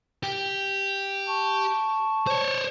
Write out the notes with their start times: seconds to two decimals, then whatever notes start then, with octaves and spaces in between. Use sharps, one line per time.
0.23 G4
1.27 A5 C#6
2.27 C5 C#5